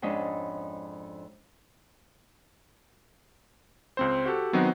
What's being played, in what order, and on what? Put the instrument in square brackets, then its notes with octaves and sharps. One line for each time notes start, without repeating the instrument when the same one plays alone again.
[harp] F2 G#2 C#4 D4 D#5 B5
[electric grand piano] C#2 C4 C5
F#4 G4 A4
D#3 F#3 B3 C4 D#4 B4